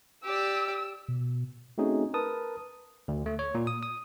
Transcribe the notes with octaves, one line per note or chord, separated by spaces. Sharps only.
G4 D5 E6
B2
A3 C4 C#4 D#4 F#4 G#4
A#4 B4 A5 D#6
D2
A3
C#5
A#2
D#6
D#6